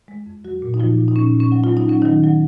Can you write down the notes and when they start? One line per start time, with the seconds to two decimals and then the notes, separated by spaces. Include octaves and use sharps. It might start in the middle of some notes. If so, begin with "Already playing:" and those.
0.08 G#3
0.26 F2
0.44 F#3 F#4
0.62 A#2
0.74 D#4
0.80 A#2 F3 F4
0.98 A#2
1.08 D#4
1.16 A#2 C#4
1.34 A#2
1.40 C#4
1.52 F#3
1.64 F4
1.69 F#3
1.77 D#4
1.88 F#3 C#4
2.02 D#3 F#3 D#4
2.24 F#3